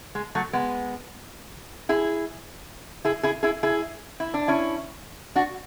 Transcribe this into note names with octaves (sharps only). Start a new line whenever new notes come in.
G#3
F#3 A3
G#3 B3
E4 G#4
E4 G#4
E4 G#4
E4 G#4
E4 G#4
E4
D4
C#4 E4
D4 F#4